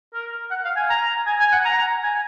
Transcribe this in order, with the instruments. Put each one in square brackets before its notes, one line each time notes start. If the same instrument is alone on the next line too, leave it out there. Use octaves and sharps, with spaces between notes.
[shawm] A#4
F#5
F5
G#5
A#5
G#5
G#5
F#5
A#5
G#5